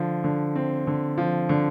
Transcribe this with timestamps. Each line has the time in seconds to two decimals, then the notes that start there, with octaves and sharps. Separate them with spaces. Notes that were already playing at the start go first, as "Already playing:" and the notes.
Already playing: D3 F3
0.24 D3
0.55 C4
0.87 D3
1.18 F3
1.49 D3